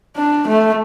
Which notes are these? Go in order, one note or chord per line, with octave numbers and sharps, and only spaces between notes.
D4
A3